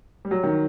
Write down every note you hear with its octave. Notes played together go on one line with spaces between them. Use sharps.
G3
F#3
D#3